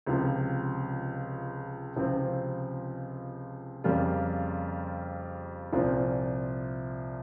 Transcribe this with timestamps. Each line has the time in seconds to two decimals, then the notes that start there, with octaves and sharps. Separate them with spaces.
0.06 C#2 C3 F3
1.96 C#2 C3 F3 C4
3.84 F2 C#3 G3 A#3 F4
5.72 C2 A#2 F3 C4